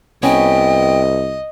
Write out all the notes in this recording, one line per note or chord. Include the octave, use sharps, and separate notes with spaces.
C2 B3 C#4 D#5 G5